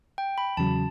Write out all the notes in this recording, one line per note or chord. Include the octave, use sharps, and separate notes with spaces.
G5
B5
E2 C#3 F#3 A5